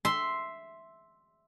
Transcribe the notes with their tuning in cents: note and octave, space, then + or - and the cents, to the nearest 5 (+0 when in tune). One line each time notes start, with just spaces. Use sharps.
E5 +0 C6 +0